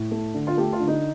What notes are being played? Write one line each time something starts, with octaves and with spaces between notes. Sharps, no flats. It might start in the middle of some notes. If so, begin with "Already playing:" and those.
Already playing: A2
A3
D3
F4
A3 G4
F4
D3
D#4